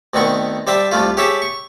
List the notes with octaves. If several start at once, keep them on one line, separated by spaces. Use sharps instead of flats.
D2 D#3 B3 C4 C#6
G3 C5 E5 G5 A5
C2 G3 A3 F4
G4 G#4 C#5 E5 G5 A5
C#6